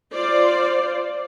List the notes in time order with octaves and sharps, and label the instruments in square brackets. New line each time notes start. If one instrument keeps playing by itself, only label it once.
[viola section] F4 C5 D5